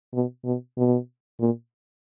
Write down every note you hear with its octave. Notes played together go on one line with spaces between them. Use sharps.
B2
B2
B2
A#2